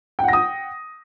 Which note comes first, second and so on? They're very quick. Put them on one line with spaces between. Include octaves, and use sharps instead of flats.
G5 F#5 A#6 D#6